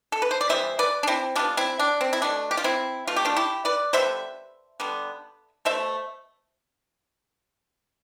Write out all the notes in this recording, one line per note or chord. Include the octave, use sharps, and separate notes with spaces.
A4
B4
C5
D5
E3 G3 B3 C5 E5
B4 D5
D4
C4 E4
E3 G3 B3 D4 F4
C4 E4
D4
C4
E4
B2 A3 D4
G4
F4
C4 E4
B2 A3 F4
G4
D4 F4
E4 G4
B4 D5
D3 G3 B3 C5 E5
D3 G3 B3
B2 A3 C5 E5